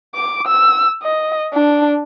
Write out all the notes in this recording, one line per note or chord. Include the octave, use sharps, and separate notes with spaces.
D6
E6
D#5
D4